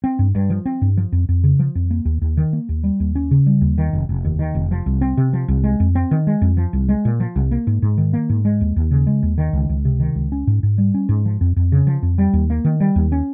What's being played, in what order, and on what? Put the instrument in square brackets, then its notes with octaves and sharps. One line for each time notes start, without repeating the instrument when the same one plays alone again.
[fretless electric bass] C4
G2
G2
F3
C4
G2
F3
F2
F2
C#3
F3
F2
A#3
D#2
D#2
D#3
A#3
D#2
G3
D#2
C#4
C#3
G3
D#2
D#3
F1
F1
D#2
D#3
F1
F3
C2
C4
C3
F3
C2
G#3
F2
C4
D#3
G#3
F2
F3
C2
G#3
A#2
F3
C2
A#3
G#2
G#2
D#3
A#3
G#2
G#3
D#2
D#2
C#3
G#3
D#2
D#3
C#2
C#2
C3
D#3
C#2
C#4
G#2
G#2
G3
C#4
G#2
F3
F2
F2
C#3
F3
F2
G3
D#2
A#3
D#3
G3
D#2
C#4